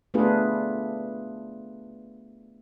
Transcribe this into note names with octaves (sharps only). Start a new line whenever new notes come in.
A3 B3 D4 F4 G#4 B4